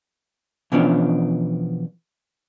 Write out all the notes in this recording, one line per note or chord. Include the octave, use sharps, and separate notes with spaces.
B2 E3 F3 B3 C#4 D4